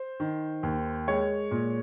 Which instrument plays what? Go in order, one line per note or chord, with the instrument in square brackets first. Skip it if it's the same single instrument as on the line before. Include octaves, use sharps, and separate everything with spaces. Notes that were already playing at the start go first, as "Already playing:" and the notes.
Already playing: [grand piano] C5
D#3
D#2
G#3 C#5
A#2